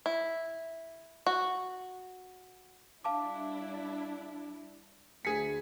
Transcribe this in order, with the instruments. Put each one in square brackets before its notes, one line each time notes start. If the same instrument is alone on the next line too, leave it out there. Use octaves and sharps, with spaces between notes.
[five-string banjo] E4
F#4
[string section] G3 D4 E4 [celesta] F5 A5 D6
[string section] D2 [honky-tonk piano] G#4 B6 [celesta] C#7